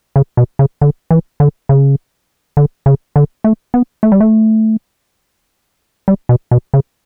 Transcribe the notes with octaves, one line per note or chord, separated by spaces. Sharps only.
C#3
B2
C#3
D3
E3
D3
C#3
D3
C#3
D3
A3
B3
A3
G3
A3
G3
B2
B2
C#3